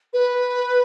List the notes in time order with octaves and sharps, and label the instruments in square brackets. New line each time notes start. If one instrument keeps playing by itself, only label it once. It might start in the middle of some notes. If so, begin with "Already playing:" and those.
[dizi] B4